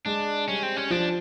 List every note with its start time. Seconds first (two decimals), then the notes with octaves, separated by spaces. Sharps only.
0.06 G#3 D4
0.48 G3 C#4
0.63 C4
0.76 C#4
0.90 F3 D4